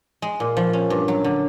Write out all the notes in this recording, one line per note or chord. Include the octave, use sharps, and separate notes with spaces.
G#3
A#2
F3
C#4
G2
F#3
D3